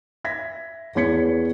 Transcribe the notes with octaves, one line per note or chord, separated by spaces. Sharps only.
E5 G#6 A#6 B6
E2 B3 C#5 G#6 B6 C#7